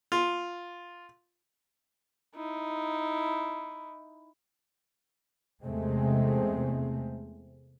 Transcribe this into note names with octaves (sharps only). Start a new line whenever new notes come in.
F4
D#4 E4
E2 C3 G#3 A3 C4